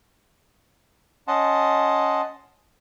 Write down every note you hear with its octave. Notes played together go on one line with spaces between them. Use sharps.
C#4 D#5 F#5 A5 C6